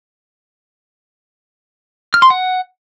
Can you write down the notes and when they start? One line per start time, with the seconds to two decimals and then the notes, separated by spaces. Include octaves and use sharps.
2.14 F6
2.22 C6
2.30 F#5